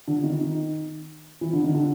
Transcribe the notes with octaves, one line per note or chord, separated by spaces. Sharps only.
D3
D#3
D#3
E3
D3
D#3
D3